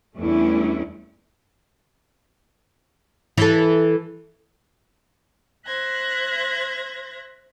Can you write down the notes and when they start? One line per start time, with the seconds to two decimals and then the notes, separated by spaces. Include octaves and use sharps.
0.18 E2 G3 A3 C#4 D4 E4
3.37 E3 A4
5.66 C5 E5 F#6 G#6 A#6